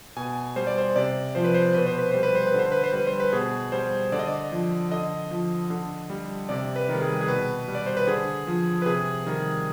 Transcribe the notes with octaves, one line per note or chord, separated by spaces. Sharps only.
B2 G#5
G3 C5
D5
C5
C3 D5
F3 C5
B4
C5
B2 B4
C5
B4
G3 C5
B4
C5
B4
D3 C5
B4
C5
G3 B4
C5
B4
B2 G#4
G3 C5
D3 D5
D#5
D5
F3
D3 D#5
F3
D3
G3
C3 D5
B4
D#3 G3
G#4
G#4
B2 B4
G3
D5
C5
B4
D3 G#4
F3
B4
C3 G#4
D#3 G3